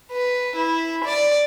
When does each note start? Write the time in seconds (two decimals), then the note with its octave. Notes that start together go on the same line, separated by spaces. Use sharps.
0.12 B4
0.56 E4
1.05 D5